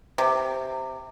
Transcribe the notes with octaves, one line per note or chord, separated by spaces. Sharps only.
C3